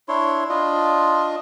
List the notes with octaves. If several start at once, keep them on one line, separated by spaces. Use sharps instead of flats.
D4 E4 C#5 C6
D4 F4 D#5